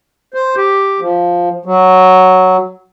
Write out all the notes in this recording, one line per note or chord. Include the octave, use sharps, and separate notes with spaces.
C5
G4
F3
F#3